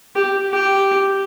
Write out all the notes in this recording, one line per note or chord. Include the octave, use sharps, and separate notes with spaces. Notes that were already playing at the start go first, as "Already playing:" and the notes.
G4
G4